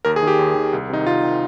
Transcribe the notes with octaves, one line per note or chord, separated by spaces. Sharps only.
D#2 A#4
G#4
D#3 G4
D#2
D#3
C2
C3 D#3 D#4
C2 F4
C3 D#3